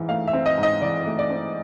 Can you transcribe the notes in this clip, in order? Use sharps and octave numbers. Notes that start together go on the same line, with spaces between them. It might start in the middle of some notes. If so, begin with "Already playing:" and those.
Already playing: G#2 E3
A3 F5
E5
C4
D#5
G#2
D#5
E3 D5
A3
D5
C4